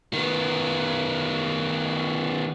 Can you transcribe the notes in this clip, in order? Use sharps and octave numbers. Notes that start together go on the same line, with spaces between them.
D#3 B3